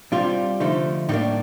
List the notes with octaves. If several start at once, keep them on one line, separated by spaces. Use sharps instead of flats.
C3 G3 D4 F4
D3 F3 A3 D#4
A2 G3 A#3 D4 D#4